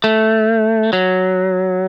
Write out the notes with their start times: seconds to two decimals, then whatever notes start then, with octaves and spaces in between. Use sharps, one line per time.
0.04 A3
0.93 F#3